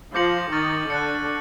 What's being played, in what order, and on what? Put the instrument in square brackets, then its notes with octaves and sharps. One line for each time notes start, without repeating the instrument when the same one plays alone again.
[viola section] F3 F4 [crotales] D6 G6 A#6 C#7 F#7
[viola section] D#3 D#4 [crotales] C#6 F6 A6
[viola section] D3 D4 [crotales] F#6 A6 C#7